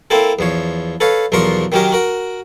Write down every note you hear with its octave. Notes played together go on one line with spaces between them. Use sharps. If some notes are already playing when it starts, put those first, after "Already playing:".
A#3 C4 E4 A4
E2 F3 C#5
A4 B4 C#5 F5
B1 E2 F3 A#4 C6 C#6
D#3 F#3 C#4 G4 A#4
F#4 A#4